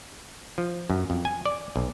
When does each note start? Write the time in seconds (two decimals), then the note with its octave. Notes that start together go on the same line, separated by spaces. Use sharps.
0.58 F3
0.90 F#2
1.10 F2
1.25 G#5
1.45 D5
1.76 B1